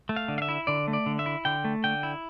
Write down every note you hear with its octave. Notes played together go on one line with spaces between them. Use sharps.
A3
F5
D3
F5
E5
E4
D3 D5
A3
D5
D3
E5
E4
D3 G5
A3
D3 G5
E4